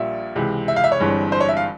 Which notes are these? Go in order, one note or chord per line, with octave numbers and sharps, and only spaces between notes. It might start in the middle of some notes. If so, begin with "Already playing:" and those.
Already playing: A#1 A#2 G3 E5
C#2 C3 E3 G#3
E5
F5
E5
C#5
G1 G2 E3 G#3 C4
C5
C#5
E5
F5